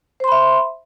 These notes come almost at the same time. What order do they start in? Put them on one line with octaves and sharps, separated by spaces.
C5 C6 B5 E5